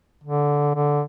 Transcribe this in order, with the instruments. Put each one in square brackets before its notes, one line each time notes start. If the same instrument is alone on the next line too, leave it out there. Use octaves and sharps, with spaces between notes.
[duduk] D3
D3